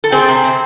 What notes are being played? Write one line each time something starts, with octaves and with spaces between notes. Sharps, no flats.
A4
C4 G#4 C5
C3
C4